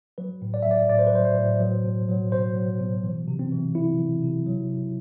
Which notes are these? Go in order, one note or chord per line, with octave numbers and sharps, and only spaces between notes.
F#3 B4
A2
D5
E5
F#3 D5
A2 D5
C5
B4
F#3 C5
C5
A2
F#3
B2
F#3
B2 C5
F#3
B2
E3
C3
C4
E3
C3 E4
E3
C3
F#3
C3